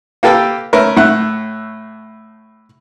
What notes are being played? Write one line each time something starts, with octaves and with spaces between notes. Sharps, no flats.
A#3 G4 A4 B4 G5
A3 C#4 A#4 B4
A2 A3 F#5